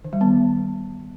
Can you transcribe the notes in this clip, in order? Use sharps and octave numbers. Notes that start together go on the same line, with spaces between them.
D#3
G3
B3